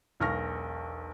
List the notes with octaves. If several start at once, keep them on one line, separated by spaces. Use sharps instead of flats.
E1 B1 C#6 F6 A#6